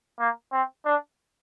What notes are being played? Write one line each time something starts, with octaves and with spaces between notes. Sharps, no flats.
A#3
C4
D4